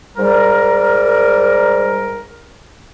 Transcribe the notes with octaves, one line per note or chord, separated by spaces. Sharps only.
G#2 G3 A#4